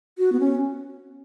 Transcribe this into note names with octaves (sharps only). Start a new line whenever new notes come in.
F#4
B3
C#4